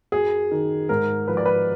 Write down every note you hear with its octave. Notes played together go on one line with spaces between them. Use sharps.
F#2 G#4
D#3
G#2 A#4
F3 B4
D5
B4